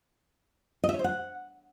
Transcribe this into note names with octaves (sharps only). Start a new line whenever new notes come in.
D#5
E5
C#5
C5
F#5